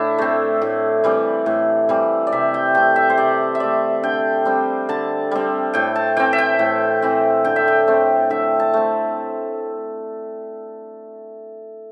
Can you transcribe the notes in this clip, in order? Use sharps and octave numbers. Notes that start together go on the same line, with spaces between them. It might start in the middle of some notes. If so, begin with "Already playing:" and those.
Already playing: A2 D4 E4
A3 C4
A2
E3 G3 C4
A2
E3 G3 C4
D5
C3 E5
G5
A3 C4 G5
E5
C5
C3 D5
E5
A3 C4 D5
D3 G5
G3 C4
D3 A5
G3 C4
A2 G5
A5
E3 C4 G5
E5
G5
A2
E3 C4
D3 G5
E5
G5
A3 C4
D3 E5
A5
A3 C4